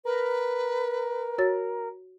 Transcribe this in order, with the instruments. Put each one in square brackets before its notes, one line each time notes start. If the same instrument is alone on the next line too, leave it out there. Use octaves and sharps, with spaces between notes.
[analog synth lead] A#4 [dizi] B4
[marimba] F#4 C#5 A6